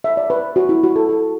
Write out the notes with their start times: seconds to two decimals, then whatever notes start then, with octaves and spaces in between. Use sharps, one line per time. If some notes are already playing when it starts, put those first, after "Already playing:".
0.04 E5
0.17 D5
0.30 B4
0.56 F#4
0.69 E4
0.83 F#4
0.96 A4
1.09 A4